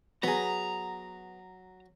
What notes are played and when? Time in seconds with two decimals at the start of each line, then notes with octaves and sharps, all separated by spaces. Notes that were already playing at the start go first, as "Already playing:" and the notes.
0.23 F#3 B3 G#4 A#5